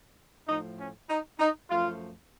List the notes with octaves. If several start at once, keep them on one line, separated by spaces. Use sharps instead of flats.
A2 F3 A3 D#4
C#4
D#4
D#4
F#2 F3 A3 F4